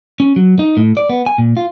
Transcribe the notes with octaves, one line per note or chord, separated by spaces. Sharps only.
C#4
F#3
D#4
A2
D5
B3
G#5
A#2
F4